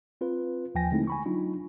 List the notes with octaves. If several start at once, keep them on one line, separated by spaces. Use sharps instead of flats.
C4 F4 B4
D#2 F3 G5 G#5 A#6
D3 G#3 A3 C4 D#4 E4
G#5 B5 C#6
F#3 D4 D#4 F4